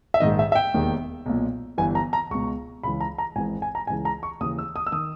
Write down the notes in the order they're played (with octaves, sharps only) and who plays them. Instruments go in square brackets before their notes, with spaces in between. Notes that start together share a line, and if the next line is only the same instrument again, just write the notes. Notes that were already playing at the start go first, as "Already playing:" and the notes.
[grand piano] E5
A#1 G#2 D#3 D#5
E5
E5
G5
E1 D#2 D#3
B1 A#2
G1 G2 E3 G#5
A#5
A#5
C#2 B2 C#6
C#2 C#3 E3 B5
A#5
A#5
G#1 G#2 E3 G#5
G#5
A#5
C#2 C#3 E3 G#5
A#5
C#6
D#2 C#3 E3 D#6
E6
D#6
E6
D#3 D#6